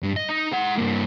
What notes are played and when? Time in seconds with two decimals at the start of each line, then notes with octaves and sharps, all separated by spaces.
0.03 G2
0.16 D#5
0.29 D#4
0.52 G#3 F#5
0.78 G2 A#3